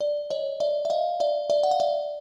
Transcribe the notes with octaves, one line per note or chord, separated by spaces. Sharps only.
D5
C#5 D#5
D5 E5
E5
D#5 F5
D5 E5
D5 E5
F#5
F5
D5 E5